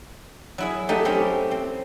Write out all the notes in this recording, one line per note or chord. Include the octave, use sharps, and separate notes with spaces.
F#3 E4 G#4
F#3 A3 D#4 G4
C4 C#4 E4 G4
C4